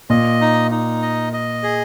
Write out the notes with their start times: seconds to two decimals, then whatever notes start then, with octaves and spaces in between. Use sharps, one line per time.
0.10 A#2 D#5
0.41 D#4
0.71 D#4
1.02 D#5
1.33 D#5
1.63 G#4